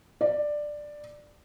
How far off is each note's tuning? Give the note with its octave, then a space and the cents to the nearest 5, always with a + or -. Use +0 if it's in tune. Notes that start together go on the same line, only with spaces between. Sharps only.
D5 +10